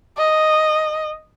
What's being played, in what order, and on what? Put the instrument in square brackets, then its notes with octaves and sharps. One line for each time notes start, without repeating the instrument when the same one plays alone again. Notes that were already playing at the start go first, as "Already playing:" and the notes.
[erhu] D#5